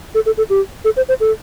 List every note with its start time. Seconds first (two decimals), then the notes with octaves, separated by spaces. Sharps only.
0.15 A4
0.26 A4
0.38 A4
0.50 G4
0.85 A4
0.97 C5
1.09 C5
1.20 A4